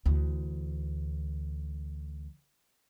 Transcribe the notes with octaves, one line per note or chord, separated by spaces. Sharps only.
D2 E3